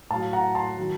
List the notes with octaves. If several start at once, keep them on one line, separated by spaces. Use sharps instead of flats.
A2 F#3 F5 A5
F#5 A#5
A5 C6
D#3 F#3